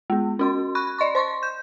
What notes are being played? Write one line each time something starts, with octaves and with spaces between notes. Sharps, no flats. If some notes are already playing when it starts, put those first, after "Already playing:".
G#3 B3
C#4 F#4 C6
B5 C#6 F#6
D5 D#5 C6 C#6
C5 C6 C#6
G6